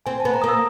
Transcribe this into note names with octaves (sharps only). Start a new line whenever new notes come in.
C4 G#5
A5
B3
A#5
A#3 D#6
E6